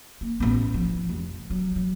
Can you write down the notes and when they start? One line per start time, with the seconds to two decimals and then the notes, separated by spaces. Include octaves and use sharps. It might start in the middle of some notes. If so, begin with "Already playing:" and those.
0.21 A#3
0.40 A1 B3
0.74 F3
1.09 F1
1.50 F#3
1.76 F#3